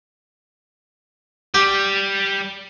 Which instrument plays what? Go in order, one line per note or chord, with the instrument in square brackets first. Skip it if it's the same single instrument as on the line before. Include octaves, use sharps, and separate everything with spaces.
[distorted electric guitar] G3 [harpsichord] G4